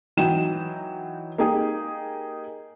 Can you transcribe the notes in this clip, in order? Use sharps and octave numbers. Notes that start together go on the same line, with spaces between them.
E3 F#3 D#4 G5 E7
A#3 D#4 G4 G#4